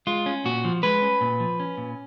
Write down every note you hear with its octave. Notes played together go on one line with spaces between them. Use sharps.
G#3 F4
C#4
A#2 F#4
F3
G#3 B4
C#4
A#2
F3
C#4
A#2